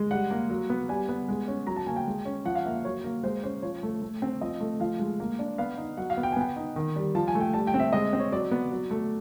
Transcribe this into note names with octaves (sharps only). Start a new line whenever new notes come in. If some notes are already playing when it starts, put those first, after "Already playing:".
Already playing: G#3
G3 F#5
A#3
F#3
B3
G3 G#5
B3
G#3
C#4
F#3 A#5
A5
A#3 G#5
G5
G#3
C#4
F3 F#5
F5
A#3 E5
F#3 C#5
A#3
G#3 C5
C#4 C5
F3 C#5
A3
A3
C4
F3 D#5
A3
F3 F5
G#3
A#3
D4
B3 F5
D#4
F#3 F#5
F5
B3
G5
G#5
B3 G5
D#4
D#3
G3
F3 A5
G#5
A3
G5
G3 A5
G5
C4
E5
G#3 D#5
C4
C#5
F#3 D5
B3
F#3
A3